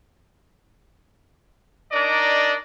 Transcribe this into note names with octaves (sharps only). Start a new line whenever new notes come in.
D4 D#4 A#4 D5 D#5